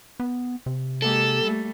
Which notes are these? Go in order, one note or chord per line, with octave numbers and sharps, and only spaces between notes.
B3
C3
G#3 A#3 G4 A4
G3 A3